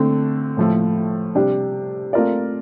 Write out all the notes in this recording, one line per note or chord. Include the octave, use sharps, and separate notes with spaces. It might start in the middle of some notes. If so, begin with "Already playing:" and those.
Already playing: D3 A3 C4
A2 F3 A3
C3 G3 D4 G4
A3 C4 F4 A#4 D5